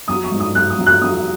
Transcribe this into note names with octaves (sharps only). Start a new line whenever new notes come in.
F#3 D#6
C#6
G#2
D#6
F#3 F#6
D#6
F#3
F#6
F#3 D#6